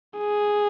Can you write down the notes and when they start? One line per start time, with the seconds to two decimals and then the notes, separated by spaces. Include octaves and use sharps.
0.19 G#4